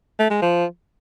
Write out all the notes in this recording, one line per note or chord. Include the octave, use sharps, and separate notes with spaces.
A3
G#3
F3